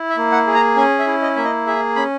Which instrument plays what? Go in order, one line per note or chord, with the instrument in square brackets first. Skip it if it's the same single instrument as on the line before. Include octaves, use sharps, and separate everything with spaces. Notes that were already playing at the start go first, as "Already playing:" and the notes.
Already playing: [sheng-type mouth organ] E4
E5
A#3
F#5
G#4
A#5
C#4 G#5
E5
E4
D#5
A#3 E5
D#5
G#4 E5
C#4 B5